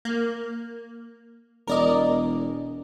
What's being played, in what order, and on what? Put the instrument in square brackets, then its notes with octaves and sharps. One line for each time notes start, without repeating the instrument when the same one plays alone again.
[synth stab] A#3
[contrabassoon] E1 [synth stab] A#4 D5 D#5